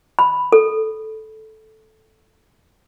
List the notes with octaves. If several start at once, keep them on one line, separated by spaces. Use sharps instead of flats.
B5
A4